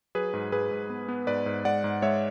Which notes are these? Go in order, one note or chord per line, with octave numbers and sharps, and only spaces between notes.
F#3 G#4 B4
G#2
G#2 G#4 B4
G#2
B3
B3
G#2 B4 D5
G#2
G#3 D5 F#5
G#2
G#3 C#5 E5